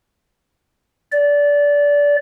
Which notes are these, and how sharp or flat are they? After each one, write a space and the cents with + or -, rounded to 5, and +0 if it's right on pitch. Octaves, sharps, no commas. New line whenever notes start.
D5 -20